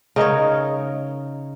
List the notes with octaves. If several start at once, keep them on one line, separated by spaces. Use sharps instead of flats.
C#3 D#4 A#4 C#5